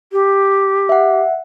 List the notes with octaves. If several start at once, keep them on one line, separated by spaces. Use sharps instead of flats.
G4
E5 F#5